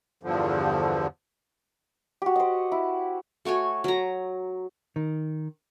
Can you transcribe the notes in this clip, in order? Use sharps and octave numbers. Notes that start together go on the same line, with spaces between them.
E2 G2 D3 F3
F#4 G4
C5 D#5
E4
A3 F#4 C#5 G#5
F#3 A#5
D#3